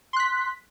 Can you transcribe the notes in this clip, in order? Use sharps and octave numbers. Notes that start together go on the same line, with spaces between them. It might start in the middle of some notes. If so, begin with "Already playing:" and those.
C6 F#6 B6